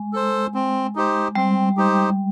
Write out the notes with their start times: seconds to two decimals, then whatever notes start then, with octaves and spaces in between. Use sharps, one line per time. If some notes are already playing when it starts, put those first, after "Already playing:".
Already playing: G#3
0.13 A4 C5
0.54 C4
0.96 D#4 G4 C5
1.35 G3 C4
1.77 D#4 G4 C5